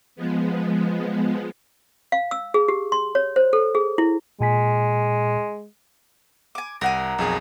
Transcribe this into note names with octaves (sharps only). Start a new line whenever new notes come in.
F3 G#3 B3
F5
E6
G#4
G4
C6
C#5
C5
A4
G#4
E4
A#2 G#3 G#5 B6
G#5 D6
C2 A#4 F#5 G#5 A#6
B1 F2 G#4